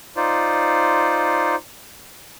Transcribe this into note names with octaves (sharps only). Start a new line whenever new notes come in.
D#4 F4 C5 D5